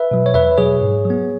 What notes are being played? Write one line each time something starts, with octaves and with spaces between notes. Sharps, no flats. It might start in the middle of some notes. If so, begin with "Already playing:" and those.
Already playing: B4 E5
B2 F#3
C#5
E2 B4 E5
B2 F#3 G#4 C#5
G#2
F#3 B3